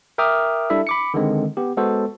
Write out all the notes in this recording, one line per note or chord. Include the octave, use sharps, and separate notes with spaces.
A#4 E5 G5 D6 D#6 F6
G3 D4 E4 A4 E5
B5 D6 C#7
D3 D#3 G#3 C4
B3 G4
G#3 B3 F#4 A4 C5